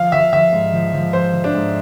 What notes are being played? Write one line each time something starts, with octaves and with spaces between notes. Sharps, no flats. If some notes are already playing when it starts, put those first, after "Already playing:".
Already playing: F3 F5
F3 E5
F3 E5
G#2
F3
F3
F3 C5
F3
D4
G#2